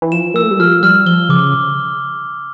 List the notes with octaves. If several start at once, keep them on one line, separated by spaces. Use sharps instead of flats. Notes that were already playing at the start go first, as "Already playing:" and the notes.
E3
F3 E7
A#3 E6
A3
G3
F3 F6
G3 F6
F3 G7
C#3 D6